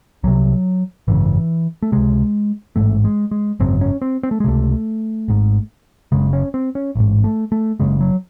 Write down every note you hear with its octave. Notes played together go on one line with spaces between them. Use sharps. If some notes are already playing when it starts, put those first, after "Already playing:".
C2 C3 F#3
G#1 F#2 C#3 E3
A3
C#2 C3 G#3
A1 G#2 A3
G#3
G#3
G#1 F#2 C#3 C4
C#4
C4
C4
A3
G#3
C#2 C3 A3
G#1 G#2
F#1 F#2 C#3 G#3
C#4
C4
C#4
A1 G#2
A3
A3
F#1 F#2 C#3 G#3
F#3